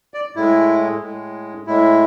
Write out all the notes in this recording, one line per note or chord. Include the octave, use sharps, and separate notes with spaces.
D5
A2 G#3 E4
A2 G#3
A2 G#3 E4